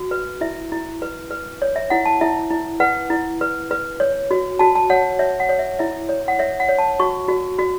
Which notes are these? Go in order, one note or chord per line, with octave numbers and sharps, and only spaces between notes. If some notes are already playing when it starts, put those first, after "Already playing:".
Already playing: F#4
B4
E4 E5
E4
B4
B4
C#5
E5
E4 F#5
A5
E4 E5
E4
B4 F#5
E4
B4
B4
C#5
F#4
F#4 A5
A5
C#5 F#5
C#5 E5
F#5
C#5
E5
E4 E5
C#5
F#5
C#5 E5
F#5
C#5
A5
F#4 C#6
F#4
F#4